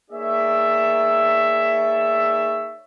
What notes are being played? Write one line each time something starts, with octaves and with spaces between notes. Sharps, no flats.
A#3 D#4 G#4 C#5 D5 E5